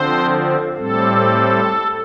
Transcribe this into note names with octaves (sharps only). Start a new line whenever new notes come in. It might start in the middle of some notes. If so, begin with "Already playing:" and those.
Already playing: D3 F3 C4 C5
A2 G3 C4 A4